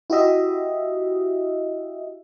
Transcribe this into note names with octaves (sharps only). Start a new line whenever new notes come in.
E4 F#4 G4 D#5 E5